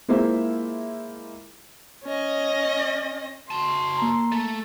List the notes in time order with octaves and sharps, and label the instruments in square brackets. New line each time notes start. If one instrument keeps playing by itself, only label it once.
[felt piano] G#3 A#3 E4 F4 C5 E5
[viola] C#4 D#5
[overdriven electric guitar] F#4 A5 [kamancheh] C6
[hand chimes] A#3 A#5
[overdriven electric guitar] A3 [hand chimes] A6